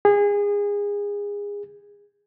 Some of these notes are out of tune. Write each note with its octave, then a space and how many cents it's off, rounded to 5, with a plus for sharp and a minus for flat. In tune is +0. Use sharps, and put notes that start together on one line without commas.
G#4 -25